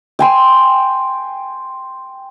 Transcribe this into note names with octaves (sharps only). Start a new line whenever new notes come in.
G5 G#5 C6